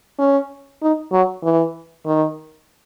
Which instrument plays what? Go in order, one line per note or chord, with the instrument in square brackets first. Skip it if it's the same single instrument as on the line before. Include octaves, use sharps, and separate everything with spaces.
[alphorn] C#4
D#4
F#3
E3
D#3